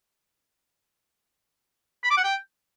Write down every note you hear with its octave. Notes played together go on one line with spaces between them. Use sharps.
B5
D6
F#5
G5